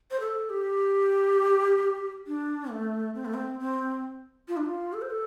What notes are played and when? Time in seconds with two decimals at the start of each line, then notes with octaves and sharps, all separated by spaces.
0.11 C5
0.20 A4
0.50 G4
2.27 D4
2.70 A3
3.15 C4
3.25 A3
3.34 C4
3.60 C4
4.48 F4
4.57 D4
4.65 F4
4.93 A4
5.02 C5
5.10 A4